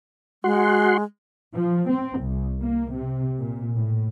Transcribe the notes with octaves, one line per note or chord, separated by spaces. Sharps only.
G#3 F#4 F#5 C6
F3
C4
C2
A#3
C3
A#2
A2